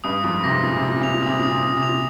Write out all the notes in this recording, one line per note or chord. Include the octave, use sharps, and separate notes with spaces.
G2 D#6
F2 G#2 D#6
G#2 C3 A#6
A#2 D#6
C3
A#6
A#2
C3 F7
A#2
C3 D#6
A#2 D#6
C3
A#2 D#6
C3
F7
A#2